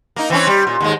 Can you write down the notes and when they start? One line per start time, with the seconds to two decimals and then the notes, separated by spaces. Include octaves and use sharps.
0.16 A#3 D#4
0.30 E3 C4 C#4
0.47 G3
0.67 A#2
0.81 D#2 G#2 G#3